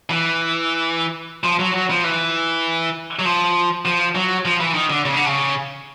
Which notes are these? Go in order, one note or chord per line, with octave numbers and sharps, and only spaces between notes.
E3
F3
F#3
F#3
F3
E3
F#3
F3
F3
F#3
F3
E3
D#3
D3
C#3
D3
C#3